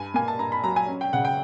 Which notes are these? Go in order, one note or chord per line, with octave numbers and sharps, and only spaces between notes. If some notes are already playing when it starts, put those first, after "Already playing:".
Already playing: G2 G#5
A#3 G#5
A5
G2 A#5
B5
F#3 A#5
G#5
C#4
G5
C#3 F#5
G5